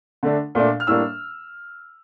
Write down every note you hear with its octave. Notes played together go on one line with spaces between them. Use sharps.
D3 A3 D4
A#2 A3 D4
F6
A2 G3 A#3 D4 E6